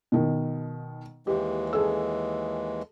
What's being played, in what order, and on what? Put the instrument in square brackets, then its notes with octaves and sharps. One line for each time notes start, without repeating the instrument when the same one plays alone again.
[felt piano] B2 D#3
[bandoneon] D#2 E3 G#3 [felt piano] G4
[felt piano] G#4 A4 E6